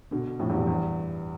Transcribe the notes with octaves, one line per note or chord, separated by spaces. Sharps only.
B2 D3
F2 A2
E2 G2
F2
E2 G2